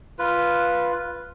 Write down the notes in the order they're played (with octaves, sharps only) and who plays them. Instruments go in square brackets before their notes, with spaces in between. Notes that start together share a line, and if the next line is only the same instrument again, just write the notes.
[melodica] F4 B4